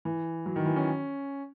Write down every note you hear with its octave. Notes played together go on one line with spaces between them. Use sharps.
E3
F#3
D#3
E3
C#4